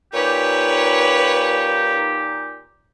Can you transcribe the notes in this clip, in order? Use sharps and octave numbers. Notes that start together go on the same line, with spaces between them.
A#2 D#4 G4 B4 C#5